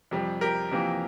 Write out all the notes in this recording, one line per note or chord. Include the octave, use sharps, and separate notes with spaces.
F2 C3 G3
G4 A#4
F2 C3 E3 A#3